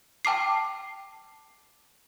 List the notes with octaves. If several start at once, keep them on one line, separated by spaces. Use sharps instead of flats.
G5 A5 D6 C7